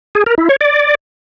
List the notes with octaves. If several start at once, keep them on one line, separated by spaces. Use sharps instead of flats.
G#4
A#4
E4
C#5
D5